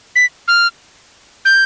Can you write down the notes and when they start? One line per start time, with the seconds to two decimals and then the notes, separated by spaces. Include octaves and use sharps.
0.16 B6
0.48 F6
1.45 G6